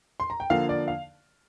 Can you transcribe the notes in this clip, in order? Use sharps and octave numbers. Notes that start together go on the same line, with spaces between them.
C6
A#5
G5
D3 F3 A#3 F5
D5
F5